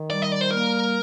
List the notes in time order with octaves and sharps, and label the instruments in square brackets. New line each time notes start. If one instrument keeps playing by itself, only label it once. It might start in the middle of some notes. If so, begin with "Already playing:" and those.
Already playing: [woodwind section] D#3
[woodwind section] G3 [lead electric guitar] D5
[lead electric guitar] D#5
D5
C5
[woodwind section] A#3 [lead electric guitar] A#4